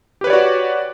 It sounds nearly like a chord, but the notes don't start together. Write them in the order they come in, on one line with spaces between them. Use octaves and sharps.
G4 B4 C#5 D5 F#4